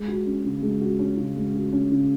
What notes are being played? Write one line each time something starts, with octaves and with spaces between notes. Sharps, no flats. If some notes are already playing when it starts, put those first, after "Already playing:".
Already playing: G#3
F#4
C#4
C#3
G#3
F#4
C#4
C#3
G#3
F#4
C#4
C#3